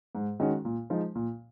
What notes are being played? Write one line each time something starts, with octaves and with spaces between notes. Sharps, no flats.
G#2
D#3 G#3 C#4 F#4
A#2
F3 G#3 D#4
A#2